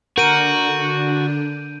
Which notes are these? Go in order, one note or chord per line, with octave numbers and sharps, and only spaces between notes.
D3 D4 F#4 A#4 G6 D7 D#7